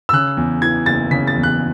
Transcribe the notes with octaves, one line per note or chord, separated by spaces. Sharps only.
E6
C#3 F#6
E2
E3 G#6
F#1 A6
C#3 B6
A6
E2
F#6